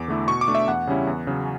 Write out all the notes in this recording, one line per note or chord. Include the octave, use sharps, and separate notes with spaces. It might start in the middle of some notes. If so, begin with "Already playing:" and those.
Already playing: E2 D6
D3 A3 E4
B2 C#6
D6
A3 D4
E5
E2 F#5
C#3 G3 C#4 E4
E2
C#3 F#3 C#4